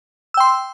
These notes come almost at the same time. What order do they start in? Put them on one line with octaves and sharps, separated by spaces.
E6 G5 C6